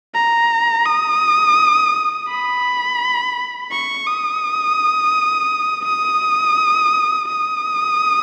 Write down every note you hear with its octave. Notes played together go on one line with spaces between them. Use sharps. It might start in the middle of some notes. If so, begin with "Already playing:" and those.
A#5
D#6
B5
C#6
D#6
D#6
D#6